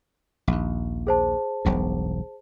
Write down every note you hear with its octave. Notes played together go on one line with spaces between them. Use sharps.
A#1 D#2
G#4 C5 A5
E1 B1 G2